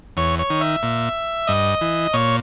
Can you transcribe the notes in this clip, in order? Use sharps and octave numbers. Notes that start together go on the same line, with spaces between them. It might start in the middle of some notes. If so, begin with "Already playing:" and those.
E2 C#5
C#5
D#3
E5
A#2
G2 D#5
E3
A#2 C#5